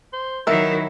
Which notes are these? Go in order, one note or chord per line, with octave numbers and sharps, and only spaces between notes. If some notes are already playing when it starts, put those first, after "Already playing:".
C5
D#3 F#3 E4 A#4 B4 E5